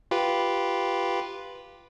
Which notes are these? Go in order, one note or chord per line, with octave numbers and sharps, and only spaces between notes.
F4 G4 B4